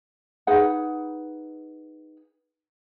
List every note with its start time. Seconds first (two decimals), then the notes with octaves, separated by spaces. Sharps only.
0.47 D#4 G#4 B4 F#5